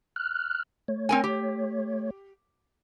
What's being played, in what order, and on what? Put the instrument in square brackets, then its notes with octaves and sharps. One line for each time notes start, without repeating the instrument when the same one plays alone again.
[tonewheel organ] F6 F#6
A3 C#5
[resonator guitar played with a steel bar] C4 A#4 G#5
G4